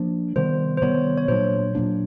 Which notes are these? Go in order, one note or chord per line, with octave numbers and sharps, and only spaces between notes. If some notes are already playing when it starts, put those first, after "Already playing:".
Already playing: F3 A#3 D4
C3 D#3 G3 B3 C5
C5
C3 D#3 G3 B3 C#5
C#5
A#2 F#3 A#3 D4 C5
A#2 F#3 A#3 D4